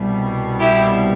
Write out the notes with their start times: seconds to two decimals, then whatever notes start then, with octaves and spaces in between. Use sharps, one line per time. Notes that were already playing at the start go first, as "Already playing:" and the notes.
Already playing: C2 B2 G3
0.60 E4 G4